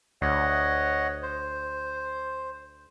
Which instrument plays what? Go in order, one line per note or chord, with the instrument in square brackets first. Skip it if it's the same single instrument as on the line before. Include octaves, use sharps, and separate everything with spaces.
[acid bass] D2 [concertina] C#5 D#5 F#5
[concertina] C5